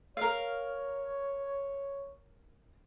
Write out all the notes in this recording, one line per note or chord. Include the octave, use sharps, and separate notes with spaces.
A#4 C#5 F5